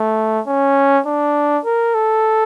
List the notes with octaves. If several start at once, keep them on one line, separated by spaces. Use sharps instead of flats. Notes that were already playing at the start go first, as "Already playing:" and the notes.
Already playing: A3
C#4
D4
A#4
A4